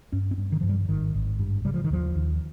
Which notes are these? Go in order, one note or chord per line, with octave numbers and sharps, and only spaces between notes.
G2 C#4
C4
G2
D#3
G2 F3
G3
G#1 D#3
G#1
G2
C#3 G3
F3
D#3
D#2 F3
D#2